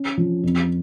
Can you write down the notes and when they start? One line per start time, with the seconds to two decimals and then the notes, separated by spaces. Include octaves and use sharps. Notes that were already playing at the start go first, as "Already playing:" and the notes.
Already playing: C#4
0.17 F3
0.43 F2